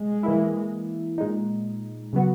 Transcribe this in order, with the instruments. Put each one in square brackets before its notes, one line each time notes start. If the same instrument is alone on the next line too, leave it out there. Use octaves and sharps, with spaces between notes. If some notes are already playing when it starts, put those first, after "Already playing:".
Already playing: [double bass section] G#3
[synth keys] E3 A#3 E4
A#2 G#3 D#4
C#3 F#3 B3 F#4